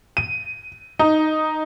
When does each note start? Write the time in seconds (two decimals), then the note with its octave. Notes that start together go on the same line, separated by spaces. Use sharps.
0.17 D#7
0.99 D#4